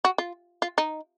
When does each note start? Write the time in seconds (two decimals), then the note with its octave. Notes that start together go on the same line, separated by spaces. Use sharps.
0.05 F#4
0.18 F4
0.62 F4
0.78 D#4